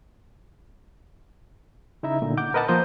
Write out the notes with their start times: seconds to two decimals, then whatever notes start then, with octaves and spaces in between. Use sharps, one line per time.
2.03 C#3 D#4 E4 E5 A#5
2.22 A#2 D3
2.37 F#5 D6 G6
2.54 A#4 B4 D#5 F#5 A5
2.68 F3 A#3 C5 A#5 D#6 G6